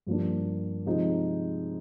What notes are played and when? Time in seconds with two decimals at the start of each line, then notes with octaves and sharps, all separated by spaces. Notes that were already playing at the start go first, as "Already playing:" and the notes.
0.07 G2 F3 A#3 D4
0.86 C3 F3 G#3 D#4